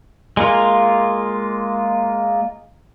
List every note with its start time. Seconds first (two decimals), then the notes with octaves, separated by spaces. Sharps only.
0.37 G#3 A#3 F4